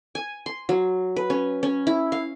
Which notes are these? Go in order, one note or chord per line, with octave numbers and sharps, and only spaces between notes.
G#5
C6
F#3
B4
C#4
C#4
E4
F5